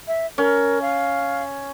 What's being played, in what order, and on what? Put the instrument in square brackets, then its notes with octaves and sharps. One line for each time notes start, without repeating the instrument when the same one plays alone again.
[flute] E5
[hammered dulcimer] C#4 [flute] A#4
[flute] F5